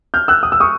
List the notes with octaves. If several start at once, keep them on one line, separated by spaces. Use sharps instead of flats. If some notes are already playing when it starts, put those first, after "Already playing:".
F6 G6
E6 F#6
D#6
E6
C#6 D#6